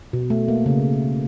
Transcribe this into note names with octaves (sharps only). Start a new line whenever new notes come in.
B2
A3
A#3
C#3